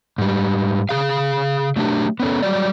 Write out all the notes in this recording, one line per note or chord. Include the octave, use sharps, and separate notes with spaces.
G#2 G3
C#3 G#4 F5
F#3 A3 D4 G4
B3 C#4 A4
F#3 G3 D5